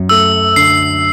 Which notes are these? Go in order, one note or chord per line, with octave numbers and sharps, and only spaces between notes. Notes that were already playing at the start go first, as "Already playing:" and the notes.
Already playing: F#2
A3 E6
D3 C7